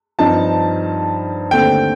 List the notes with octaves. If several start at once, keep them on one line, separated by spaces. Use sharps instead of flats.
G2 F3 C4 D#4 A5
D#2 D3 A3 C4 G5